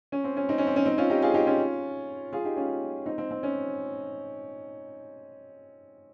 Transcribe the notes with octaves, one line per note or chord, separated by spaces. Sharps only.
C#4
C4
C#4
C4 D#4
C#4
C4
C#4
C4 D#4
C#4 F4
D#4 G4
F4 G#4
D#4 G4
C#4 F4
F4 G#4
D#4 G4
C#4 F4
C4 D#4
C4
C4
C#4